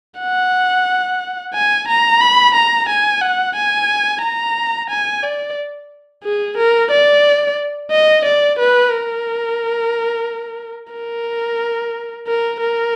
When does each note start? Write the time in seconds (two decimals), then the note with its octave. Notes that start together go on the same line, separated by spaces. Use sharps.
0.20 F#5
1.54 G#5
1.88 A#5
2.21 B5
2.54 A#5
2.88 G#5
3.22 F#5
3.56 G#5
4.22 A#5
4.90 G#5
5.23 D5
6.24 G#4
6.57 A#4
6.91 D5
7.91 D#5
8.25 D5
8.59 B4
8.91 A#4
10.93 A#4
12.27 A#4
12.60 A#4